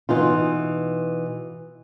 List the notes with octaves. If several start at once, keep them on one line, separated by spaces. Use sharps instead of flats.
B2 E3 D#4 F4